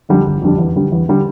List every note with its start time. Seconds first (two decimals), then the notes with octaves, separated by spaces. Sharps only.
0.09 F2 D3 G3 D4
0.26 G1
0.42 F2 D3 G3 D4
0.58 E2
0.76 D3 G3
0.92 E2
1.09 D3 G3